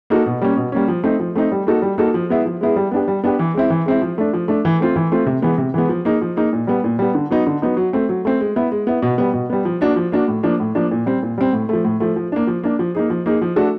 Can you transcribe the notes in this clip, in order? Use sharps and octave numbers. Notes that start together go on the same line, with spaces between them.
A#3 D#4 F#4 A4
B2
G3 A#3 C#4
B2
G3 A#3 C#4
F3
A3 C4 D#4
F3
A3 C4 D#4
G3
A#3 D#4 F#4 A4
G3
A#3 D#4 F#4 A4
F3
G#3 B3 E4 G#4
F3
G#3 B3 E4 G#4
G3
B3 D4 G4
G3
B3 D4 G4
E3
G#3 C4 E4
E3
G#3 C4 E4
F3
A3 D4
F3
A3 D4
E3
A3 C4 F4
E3
A3 C4 F4
C3
E3 G#3 B3
C3
E3 G#3 B3
F3
A#3 D#4 G#4
F3
A#3 D#4 G#4
A#2
G3 B3
A#2
G3 B3
D3
F#3 B3 D#4
D3
F#3 B3 D#4
F#3
A3 C4
F#3
A3 C4
G#3
B3 E4
G#3
B3 E4
B2
G3 B3
B2
G3 B3
F3
A#3 D4 F#4
F3
A#3 D4 F#4
A2
F3 A#3 D4
A2
F3 A#3 D4
A#2
G3 C4
A#2
G3 C4
A2
F3 A3
A2
F3 A3
F3
A#3 D4
F3
A#3 D4
F3
A#3 D#4 G#4
F3
A#3 D#4 G#4
F3
A3 D4 F#4 A4